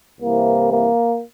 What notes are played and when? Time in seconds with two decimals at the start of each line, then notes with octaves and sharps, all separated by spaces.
0.21 C2 C3 E3 A#3
0.70 A#3